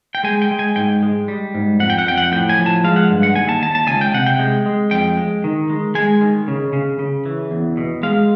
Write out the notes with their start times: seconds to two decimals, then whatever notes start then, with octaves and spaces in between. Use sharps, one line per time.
0.15 G5
0.24 G#3 G#5
0.42 G5
0.51 G#3
0.59 G#5
0.76 G#2 G5
1.03 G#3
1.28 G3
1.55 G#2
1.80 F2 F#5
1.90 G5
1.99 F#5
2.07 F2 G5
2.18 F#5
2.32 A2 G5
2.49 G#5
2.59 F3
2.66 A5
2.84 G#3 F5
2.96 F#5
3.10 G2
3.23 F#5
3.36 D#2 G#5
3.49 A5
3.62 D#2 A5
3.75 A5
3.87 C#2 G#5
4.01 G5
4.14 C3 F#5
4.27 G5
4.39 G#3
4.66 G#3
4.91 F2 G5
5.17 G#3
5.44 D#3
5.70 G#3
5.95 G#3 G#5
6.21 D#3
6.48 C#3
6.73 C#3
6.99 C#3
7.26 E3
7.51 E2
7.77 B2
8.03 G#3 F5